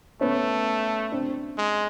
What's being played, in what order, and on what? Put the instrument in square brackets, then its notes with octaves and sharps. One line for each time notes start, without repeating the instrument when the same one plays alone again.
[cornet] A3 [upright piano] B3 C#4
[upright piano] C4 D4
[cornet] G#3